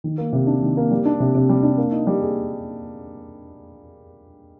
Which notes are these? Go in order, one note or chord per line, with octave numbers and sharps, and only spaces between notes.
D#3
A#3
C3
D4
D#3
A#3
G3
D4
C3
C3
G3
D4
A#3
D#4
G3
G#4